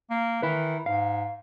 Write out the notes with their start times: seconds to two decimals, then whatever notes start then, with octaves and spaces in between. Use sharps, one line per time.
0.10 A#3
0.42 D#3 E4 B4
0.86 G#2 F5